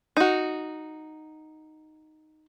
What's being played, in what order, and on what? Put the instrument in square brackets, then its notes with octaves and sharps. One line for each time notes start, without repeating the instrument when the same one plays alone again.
[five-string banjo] D#4 F#4